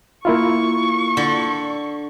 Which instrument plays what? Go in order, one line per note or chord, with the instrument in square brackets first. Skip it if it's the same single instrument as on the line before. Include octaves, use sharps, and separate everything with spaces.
[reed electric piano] A#3 E4 F4 [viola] C#6
[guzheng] D3